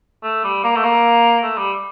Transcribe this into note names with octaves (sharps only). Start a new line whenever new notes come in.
A3
G3
A#3
A3
A#3
A3
G3